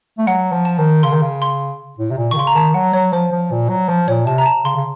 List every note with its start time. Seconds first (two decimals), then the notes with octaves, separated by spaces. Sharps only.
0.18 A3
0.27 F#3 F#5
0.53 F3
0.65 A5
0.78 D#3
1.03 C#3 C6
1.13 D#3
1.22 C#3
1.42 C6
1.99 A2
2.11 C3
2.18 A#2
2.31 D#3 C#6
2.37 C#3 C6
2.47 A#5
2.55 D#3 A5
2.74 F#3 F#5
2.93 F#3 C#5
3.13 F3 C5
3.32 F3
3.51 A#2
3.69 F#3
3.89 F3
4.08 A#2 C#5
4.27 C3 A5
4.38 A#5
4.46 A5
4.65 C#3 C6
4.76 C#3